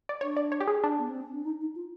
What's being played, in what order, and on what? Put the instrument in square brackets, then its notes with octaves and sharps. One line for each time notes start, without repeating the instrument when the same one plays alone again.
[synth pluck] D5
[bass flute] D4 [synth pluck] C#5
[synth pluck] D5
C#5
G4
G#4
D4
[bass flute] B3
C4
C#4
D4
D#4
D#4
F4